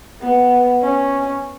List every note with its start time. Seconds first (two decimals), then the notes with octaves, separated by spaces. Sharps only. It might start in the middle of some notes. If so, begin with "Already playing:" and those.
0.21 B3
0.82 C#4